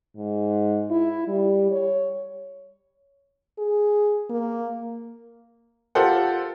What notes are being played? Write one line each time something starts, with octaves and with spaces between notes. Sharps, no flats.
G#2
E4
G3
C#5
G#4
A#3
F4 G4 A4 A#4 C5 F#5